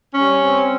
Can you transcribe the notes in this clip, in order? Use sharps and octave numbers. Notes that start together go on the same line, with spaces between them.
G3 C#4
C4